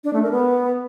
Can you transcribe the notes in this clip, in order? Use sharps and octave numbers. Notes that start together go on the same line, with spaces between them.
D4
A3
A#4
B3